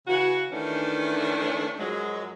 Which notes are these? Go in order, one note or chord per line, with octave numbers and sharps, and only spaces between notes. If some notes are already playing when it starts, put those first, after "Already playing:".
C#3 E3 F#4
D#3 E3 A3 C#4 D4
F#2 F3 F#3 G#3